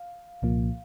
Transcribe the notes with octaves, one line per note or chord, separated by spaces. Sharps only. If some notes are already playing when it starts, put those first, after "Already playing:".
Already playing: F5
C2 A#2 F3 A#3